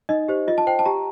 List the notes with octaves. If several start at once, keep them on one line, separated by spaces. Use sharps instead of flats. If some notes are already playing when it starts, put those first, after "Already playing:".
D#4 D#5
G4 C5
F4 D#5
A5
C5 G5
A5
G4 A#5